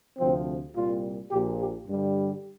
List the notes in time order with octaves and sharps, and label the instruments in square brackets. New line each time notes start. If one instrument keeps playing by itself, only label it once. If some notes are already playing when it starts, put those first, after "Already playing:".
[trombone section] D2 C3 F3 C4
C2 A#2 G3 F4
A#1 A#2 F3 G4
G4
G2 D3 G3